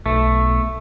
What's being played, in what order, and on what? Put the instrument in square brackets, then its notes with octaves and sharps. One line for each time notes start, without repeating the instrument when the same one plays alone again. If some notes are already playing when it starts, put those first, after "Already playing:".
[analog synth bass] B1 [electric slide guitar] A3